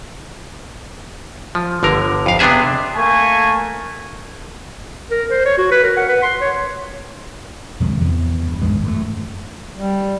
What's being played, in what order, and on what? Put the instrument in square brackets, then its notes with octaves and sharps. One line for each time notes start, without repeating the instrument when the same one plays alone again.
[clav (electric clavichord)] F3
G1 D3 A#4
F2 F5
C3 B3 D4 G#4 E5
[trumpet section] A3 A#3 G#5 C#6
[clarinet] A#4
C5
C#5
F#4
B4
A#4
F#5
B4
C6
C#5
[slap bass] F2 C3 D#3 G#3
E2
G2
G#1 G#2 E3 G#3
F#2 A3
[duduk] G3